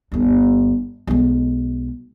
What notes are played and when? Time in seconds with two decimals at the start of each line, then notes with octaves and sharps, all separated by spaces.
0.12 G1 D#2
1.07 B1 G#3